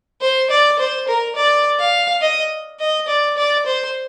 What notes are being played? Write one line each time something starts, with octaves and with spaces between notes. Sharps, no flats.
C5
D5
C5
A#4
D5
F5
D#5
D#5
D5
D5
C5